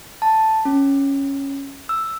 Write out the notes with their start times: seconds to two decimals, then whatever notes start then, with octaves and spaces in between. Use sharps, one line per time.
0.22 A5
0.65 C#4
1.89 E6